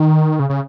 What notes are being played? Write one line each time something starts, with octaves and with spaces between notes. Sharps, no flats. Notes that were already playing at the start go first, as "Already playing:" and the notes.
Already playing: D#3
C#3
C#3